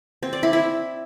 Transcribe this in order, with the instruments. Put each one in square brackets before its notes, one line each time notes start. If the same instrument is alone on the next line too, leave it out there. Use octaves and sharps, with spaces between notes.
[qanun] C4
D5
E4
E4